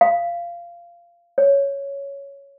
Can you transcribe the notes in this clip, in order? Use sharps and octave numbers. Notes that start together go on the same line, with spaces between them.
F5
C#5